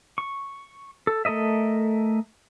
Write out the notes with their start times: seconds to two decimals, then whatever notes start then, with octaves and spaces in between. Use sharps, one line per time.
0.18 C#6
1.07 A4
1.25 A3 A4 A#4 D#5 E5